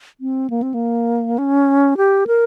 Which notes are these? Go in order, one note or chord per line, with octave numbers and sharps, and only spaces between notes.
C4
A#3
C4
A#3
C#4
G4
A#4